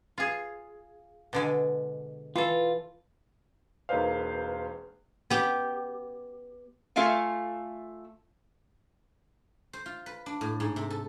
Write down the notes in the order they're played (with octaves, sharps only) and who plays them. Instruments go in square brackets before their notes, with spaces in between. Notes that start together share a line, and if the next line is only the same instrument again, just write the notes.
[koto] F4 G#4
B2 D3 G#3
[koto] E3 A4 [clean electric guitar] F4
[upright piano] E1 A#3 D#4 B4 C5 F5
[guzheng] B3 G4
[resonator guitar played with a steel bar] A3 F4 E5 F5 G#5
[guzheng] C5
F4
B4
D4
A2
G#2
C3
A4